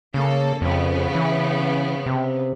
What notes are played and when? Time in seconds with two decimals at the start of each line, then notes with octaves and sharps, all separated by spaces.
0.14 C#3 A#3 A4
0.62 F2 C#3 B3
1.15 E3
2.06 C3